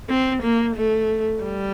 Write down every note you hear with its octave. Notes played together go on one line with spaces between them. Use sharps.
C4
A#3
A3
G3